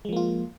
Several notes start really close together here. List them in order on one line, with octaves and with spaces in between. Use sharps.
G#3 F3 A#3 F4